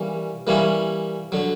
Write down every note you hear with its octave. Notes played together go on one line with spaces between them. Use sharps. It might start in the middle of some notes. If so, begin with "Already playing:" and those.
Already playing: E3 G3 A#3 C#4
E3 G3 A#3 C#4 E4
D3 F#3